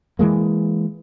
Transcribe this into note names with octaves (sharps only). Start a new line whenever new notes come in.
E3 F3 G#3 A#3